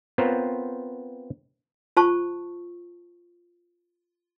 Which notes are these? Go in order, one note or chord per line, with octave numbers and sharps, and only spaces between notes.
B3 C4 F4 A#4 C5 C#5
F4 C5 A5 C#6